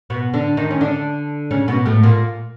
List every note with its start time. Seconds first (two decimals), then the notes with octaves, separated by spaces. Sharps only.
0.10 B2 B3
0.34 D3 D4
0.57 D#3 D#4
0.71 C#4
0.81 D3 D4
1.51 C#3 C#4
1.68 B2 B3
1.85 A2 A3
2.03 A#2 A#3